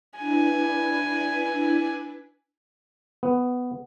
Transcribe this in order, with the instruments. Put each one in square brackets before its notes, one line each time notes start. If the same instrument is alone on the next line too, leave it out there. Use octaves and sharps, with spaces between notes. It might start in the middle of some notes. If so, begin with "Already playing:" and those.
[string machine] D4 E4 B4 [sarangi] G#5
[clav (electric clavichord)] B3